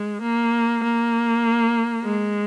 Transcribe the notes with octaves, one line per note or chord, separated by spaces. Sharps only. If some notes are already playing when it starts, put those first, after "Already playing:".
Already playing: G#3
A#3
A#3
G#3